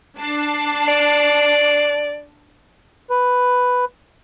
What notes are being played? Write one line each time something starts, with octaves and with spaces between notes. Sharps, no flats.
D4 A5 C7
D5
B4